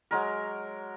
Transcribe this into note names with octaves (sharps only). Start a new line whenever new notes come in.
F#3 G#3 A#4